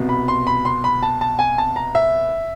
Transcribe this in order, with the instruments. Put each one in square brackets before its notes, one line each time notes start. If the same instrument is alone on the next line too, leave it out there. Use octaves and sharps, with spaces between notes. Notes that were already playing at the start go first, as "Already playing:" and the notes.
Already playing: [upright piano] C2 B2
B5
C6
B5
C6
B5
A5
A5
G#5
A5
A#5
E5